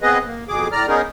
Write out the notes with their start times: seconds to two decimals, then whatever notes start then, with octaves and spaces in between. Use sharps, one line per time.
0.02 B3 C4 G#4 B4 D#5
0.26 A#3
0.48 F2 B2 G#4 D6
0.72 A2 D5 A#5 F6
0.88 B3 C#4 D#4 G#4 A#4